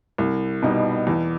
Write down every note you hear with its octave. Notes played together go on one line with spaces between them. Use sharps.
C2
B2 G3 D#4
E2